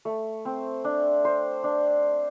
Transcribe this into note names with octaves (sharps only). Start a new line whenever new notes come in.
A3
C4
D4
C5
D4